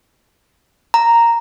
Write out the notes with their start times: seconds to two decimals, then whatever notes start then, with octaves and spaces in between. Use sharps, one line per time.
0.94 A#5